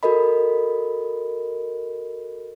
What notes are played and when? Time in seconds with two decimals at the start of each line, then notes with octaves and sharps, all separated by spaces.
0.03 F#4 A4 A#4 D#5 B5